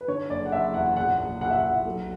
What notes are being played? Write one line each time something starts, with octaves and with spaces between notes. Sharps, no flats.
B4
D3 C#5
F#1 D5
F#5
F#1 E5
E2 F#5
A#1 F#5
A#1
A#1 F#5
E5
A#1 F#5
B1